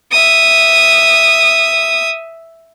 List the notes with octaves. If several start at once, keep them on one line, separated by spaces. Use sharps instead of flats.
E5 D#6